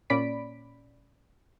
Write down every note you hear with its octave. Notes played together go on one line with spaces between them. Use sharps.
A#2 C#4 D5 B5 B6 D7